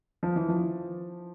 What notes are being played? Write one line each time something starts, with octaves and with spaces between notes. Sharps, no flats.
F3
E3
F3